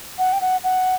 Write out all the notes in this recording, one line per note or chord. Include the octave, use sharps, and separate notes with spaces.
F#5
G5
F#5
F#5